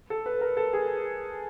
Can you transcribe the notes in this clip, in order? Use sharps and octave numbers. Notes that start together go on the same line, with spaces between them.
A4
B4
A#4
A4
G#4